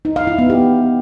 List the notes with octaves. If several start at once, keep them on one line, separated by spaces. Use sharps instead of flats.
D#4
F5
E4
B3
G4